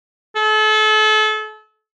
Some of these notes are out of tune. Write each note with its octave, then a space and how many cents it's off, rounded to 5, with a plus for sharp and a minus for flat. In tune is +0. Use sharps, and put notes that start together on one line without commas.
A4 -35